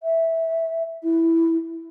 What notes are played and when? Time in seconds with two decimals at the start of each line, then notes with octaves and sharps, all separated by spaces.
0.02 E5
1.03 E4